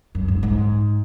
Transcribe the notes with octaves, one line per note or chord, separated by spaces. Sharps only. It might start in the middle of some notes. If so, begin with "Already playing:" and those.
F#2
G#2
G#2